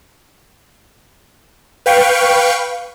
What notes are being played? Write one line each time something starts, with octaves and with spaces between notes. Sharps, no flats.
B4 F5 G5 C#6